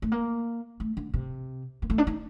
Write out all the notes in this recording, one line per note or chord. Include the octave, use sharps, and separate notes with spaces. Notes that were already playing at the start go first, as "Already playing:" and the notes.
A3
A#3
A3
D3
C3
A#3
A3
D4
D#4